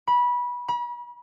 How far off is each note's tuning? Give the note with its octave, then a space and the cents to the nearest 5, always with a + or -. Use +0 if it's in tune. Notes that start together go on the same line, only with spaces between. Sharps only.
B5 -20
B5 -40